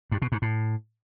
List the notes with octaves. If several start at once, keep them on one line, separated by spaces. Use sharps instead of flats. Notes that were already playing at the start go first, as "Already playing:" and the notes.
G2
B2
G#2
A2